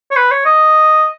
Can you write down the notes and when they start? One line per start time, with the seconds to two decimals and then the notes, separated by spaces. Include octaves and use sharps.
0.11 C#5
0.16 B4
0.31 C#5
0.46 D#5